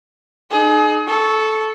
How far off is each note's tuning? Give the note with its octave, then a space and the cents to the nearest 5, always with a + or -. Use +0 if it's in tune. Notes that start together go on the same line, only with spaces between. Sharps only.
D#4 -30 G#4 +35
A4 -15 C#6 +0